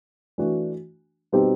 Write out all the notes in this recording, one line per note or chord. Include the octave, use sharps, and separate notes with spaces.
E3 A3 D4 F#4
B2 G3 C4 D#4 G4